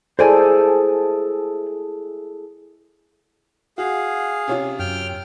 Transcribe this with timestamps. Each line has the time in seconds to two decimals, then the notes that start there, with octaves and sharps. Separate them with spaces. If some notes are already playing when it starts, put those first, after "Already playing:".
0.19 E4 G#4 A4 C5 D5 G#5
3.78 F#4 G#4 F5
4.47 C3 C#4 F4
4.79 F#2 G5 F6